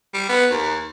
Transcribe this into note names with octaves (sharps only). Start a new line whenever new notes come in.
G3
B3
D#2